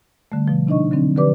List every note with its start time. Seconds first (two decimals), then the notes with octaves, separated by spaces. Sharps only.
0.32 D3 G3 A3
0.48 B2 F3
0.67 C3 D4 D#4 D#5 C#6
0.91 D3 F#3 C4 D4
1.16 D3 F3 G4 B4 D5 D6